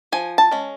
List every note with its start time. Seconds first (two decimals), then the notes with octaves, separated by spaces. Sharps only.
0.12 F3 G#5
0.38 A5
0.51 G#3 C#4